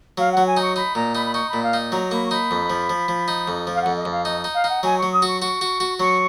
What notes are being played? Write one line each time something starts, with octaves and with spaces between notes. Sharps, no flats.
F#3 F5
F#5
F#3
G#5
D#4 C#6
D#4 B5
A#2 A#5
D#4 B5
B5
D#4 C#6
A#2 B5
F5
D#4
F#3 A#5
A#3 B5
C#6
D#4 B5
F2
F3
F3
F3
D#4
F2
F3
F5
F2 F#5
D#5
F2
F5
D#4 D#5
D#4
F5
D#4 F#5
F#3 G#5
F#3 C#6
D#6
F#4 C#6
F#4 C#6
F#4
F#4
F#3 C#6